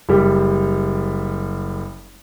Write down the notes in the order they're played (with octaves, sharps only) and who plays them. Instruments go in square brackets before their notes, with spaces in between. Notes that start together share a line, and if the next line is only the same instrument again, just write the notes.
[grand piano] F#1 G3